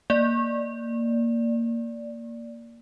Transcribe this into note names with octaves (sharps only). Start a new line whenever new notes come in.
A#3 D5